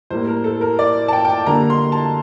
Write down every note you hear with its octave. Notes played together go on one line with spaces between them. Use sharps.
A2 G3 A#3 C5
A#4
A4
A#4
D5
A5
G5
G5
A5
D3 G3 A#3 A#5
C6
A5